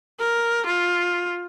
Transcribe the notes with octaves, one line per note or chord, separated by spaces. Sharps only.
A#4
F4